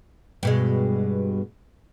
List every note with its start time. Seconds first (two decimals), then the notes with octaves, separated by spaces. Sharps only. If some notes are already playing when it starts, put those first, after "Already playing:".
0.43 G2 B2 G#3